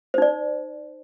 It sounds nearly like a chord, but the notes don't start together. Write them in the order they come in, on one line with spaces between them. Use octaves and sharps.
C5 D#4 D5